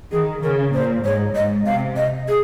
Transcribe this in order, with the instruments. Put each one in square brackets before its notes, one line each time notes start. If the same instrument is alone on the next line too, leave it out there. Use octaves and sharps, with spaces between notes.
[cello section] D#3 [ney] G#4
[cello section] C#3 [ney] A#4
[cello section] A#2 [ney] C5
[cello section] G#2 [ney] C#5
[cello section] G#2 [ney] D#5
[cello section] C3 [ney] F5
[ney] D#5
G#4